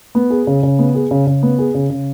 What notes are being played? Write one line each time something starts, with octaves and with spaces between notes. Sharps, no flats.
B3
G#4
C#3
C#3
B3
G#4
C#3
C#3
B3
G#4
C#3
C#3